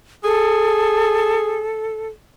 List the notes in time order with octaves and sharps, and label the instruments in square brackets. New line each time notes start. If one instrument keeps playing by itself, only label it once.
[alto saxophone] G#4 [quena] A4